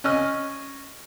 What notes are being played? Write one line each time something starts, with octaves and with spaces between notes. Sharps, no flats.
C#4 D#5 F6